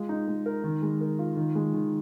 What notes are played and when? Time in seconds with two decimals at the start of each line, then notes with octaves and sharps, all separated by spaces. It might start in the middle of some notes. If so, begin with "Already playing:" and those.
Already playing: G#3 F4
0.09 D#4
0.28 G#3
0.46 A#4
0.64 D#3
0.82 G#3
1.01 A#4
1.19 F4
1.37 D#3
1.55 G#3
1.74 D#3